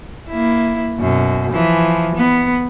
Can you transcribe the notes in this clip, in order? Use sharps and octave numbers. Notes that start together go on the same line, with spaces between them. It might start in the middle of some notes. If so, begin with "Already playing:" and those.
A#3 E4
F#2 B2
E3 F3
B3